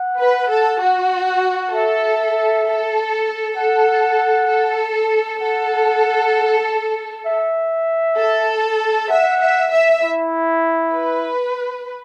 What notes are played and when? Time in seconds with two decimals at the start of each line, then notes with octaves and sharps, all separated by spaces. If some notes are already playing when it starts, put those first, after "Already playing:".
Already playing: F#5
0.18 B4
0.50 A4
0.81 F#4
1.72 A4 E5
2.66 A4
3.57 A4 F#5
4.49 A4
5.42 A4 F#5
7.26 E5
8.18 A4
9.10 E5 F#5
9.41 E5
9.72 E5
10.03 E4
10.95 B4